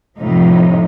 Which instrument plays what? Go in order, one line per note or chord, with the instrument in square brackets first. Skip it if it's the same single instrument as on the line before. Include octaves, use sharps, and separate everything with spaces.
[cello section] F2 A2 C3 F3 D#4